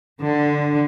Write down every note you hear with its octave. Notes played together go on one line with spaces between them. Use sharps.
D3